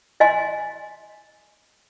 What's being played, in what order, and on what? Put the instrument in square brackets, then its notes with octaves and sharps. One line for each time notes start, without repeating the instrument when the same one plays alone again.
[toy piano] D#5 F5 G#5 C6